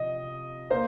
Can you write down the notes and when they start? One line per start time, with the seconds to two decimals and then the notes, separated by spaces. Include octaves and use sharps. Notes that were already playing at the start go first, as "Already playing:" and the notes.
Already playing: C3 F3 D#5
0.70 A#3 C5